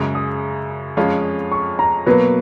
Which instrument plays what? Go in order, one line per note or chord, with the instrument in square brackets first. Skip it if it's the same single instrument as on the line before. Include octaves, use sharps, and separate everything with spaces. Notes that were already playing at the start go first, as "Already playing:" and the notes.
Already playing: [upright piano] F#2 C#3 G#3
[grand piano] D#6
[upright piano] F2 F3 G#3 C#4 F4
[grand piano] C#6
A#5
[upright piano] B2 F#3 A#3 [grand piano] B4